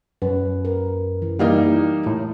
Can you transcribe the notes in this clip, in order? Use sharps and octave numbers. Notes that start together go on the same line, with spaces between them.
F#2 B4
A#4
E3
G3 A#3 D#4 E4
A2